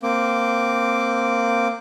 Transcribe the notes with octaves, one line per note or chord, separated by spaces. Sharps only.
A#3 C4 D6